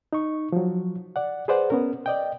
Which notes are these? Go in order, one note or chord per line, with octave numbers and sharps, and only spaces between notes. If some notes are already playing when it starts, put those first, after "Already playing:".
D#4 C#6
F3 F#3
D5 F#5
G#4 B4 C5 D5 F#5
B3 C#4 A#4
D5 D#5 G5